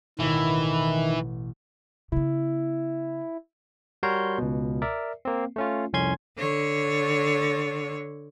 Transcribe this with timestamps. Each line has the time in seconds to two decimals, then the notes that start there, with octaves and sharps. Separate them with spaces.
0.19 A1 B2 D#3 E3 E5
2.12 C#3 B3 E4
4.03 G3 F#4 A#4 C#5 C6 G6
4.38 C#2 B2
4.82 A#4 D5 E5
5.25 A#3 C4
5.56 A3 C#4 F4
5.93 C2 F2 C#4 G#5 C6 G#6
6.37 D3 C#5